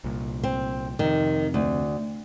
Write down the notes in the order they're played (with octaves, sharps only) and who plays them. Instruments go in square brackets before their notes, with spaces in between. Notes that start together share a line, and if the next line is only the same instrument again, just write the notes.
[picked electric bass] C2 A#2
[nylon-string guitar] C4
[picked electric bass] F2 C3 [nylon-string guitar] D#3
[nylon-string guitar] D2